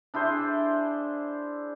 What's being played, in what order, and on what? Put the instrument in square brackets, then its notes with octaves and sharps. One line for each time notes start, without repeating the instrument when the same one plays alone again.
[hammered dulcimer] D4 E4 G#4 C5